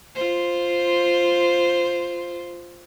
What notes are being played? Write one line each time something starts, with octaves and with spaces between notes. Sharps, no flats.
F4 C5